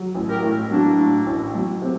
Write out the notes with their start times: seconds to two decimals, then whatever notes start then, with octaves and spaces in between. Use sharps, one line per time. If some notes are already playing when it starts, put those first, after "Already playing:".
Already playing: F#3
0.15 A1
0.29 G4 A#4
0.42 A2
0.71 F#3 A#3 D4
0.99 A2
1.26 A1
1.55 F#3
1.82 C3